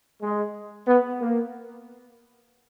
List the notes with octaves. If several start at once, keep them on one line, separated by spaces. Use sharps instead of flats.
G#3
B3
A#3